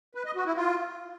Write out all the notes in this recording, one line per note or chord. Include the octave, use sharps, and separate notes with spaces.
B4
D#5
F#4
E4
F4